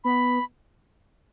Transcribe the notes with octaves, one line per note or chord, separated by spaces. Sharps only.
B3 B5